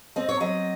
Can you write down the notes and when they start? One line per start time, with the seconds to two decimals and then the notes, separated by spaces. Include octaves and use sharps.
0.16 C4 D#5
0.29 C#5
0.40 F#3 D#5